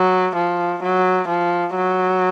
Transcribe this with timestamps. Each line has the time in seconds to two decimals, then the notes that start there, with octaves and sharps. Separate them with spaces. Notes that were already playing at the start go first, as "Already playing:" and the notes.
Already playing: F#3
0.35 F3
0.82 F#3
1.28 F3
1.75 F#3